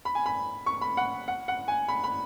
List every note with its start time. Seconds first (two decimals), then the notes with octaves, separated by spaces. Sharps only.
0.05 B5
0.15 G#5
0.26 B5
0.66 C#6
0.81 B5
0.97 F#5
1.28 F#5
1.48 F#5
1.68 G#5
1.88 B5
2.04 B5